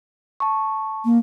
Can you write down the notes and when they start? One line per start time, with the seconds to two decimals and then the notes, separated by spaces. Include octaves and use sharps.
0.40 A5 C#6
1.05 A#3